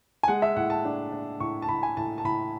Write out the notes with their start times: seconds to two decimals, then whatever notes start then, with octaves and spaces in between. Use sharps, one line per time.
0.23 G#5
0.28 G#3 F#5
0.42 E5
0.56 A2 F#5
0.70 A5
0.85 D4
1.12 D4
1.40 A2 C#6
1.62 A5
1.69 A2 B5
1.83 G#5
1.97 A2 A5
2.18 A5
2.24 A2 B5